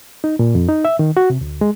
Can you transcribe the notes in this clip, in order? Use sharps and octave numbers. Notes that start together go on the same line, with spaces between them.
D#4
A#2
F2
D#4
E5
D#3
F#4
C3
D2
G#3